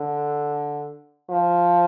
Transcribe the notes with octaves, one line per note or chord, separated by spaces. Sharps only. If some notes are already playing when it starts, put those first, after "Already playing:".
Already playing: D3
F3